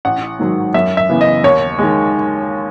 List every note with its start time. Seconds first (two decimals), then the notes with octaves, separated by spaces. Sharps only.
0.05 A1 F#5
0.39 G#2 D#3 F#3
0.74 F#2 E5
0.97 E5
1.09 C#3 E3 B3
1.21 D#5
1.44 D#2 C#5
1.79 D#3 G#3